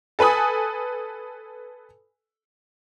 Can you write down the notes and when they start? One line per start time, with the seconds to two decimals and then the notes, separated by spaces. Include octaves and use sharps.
0.19 A4 B4 G#5 B5 D#6